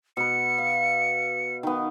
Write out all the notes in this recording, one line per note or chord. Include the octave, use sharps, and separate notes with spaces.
B2 B4 C#7
F5
D#3 B3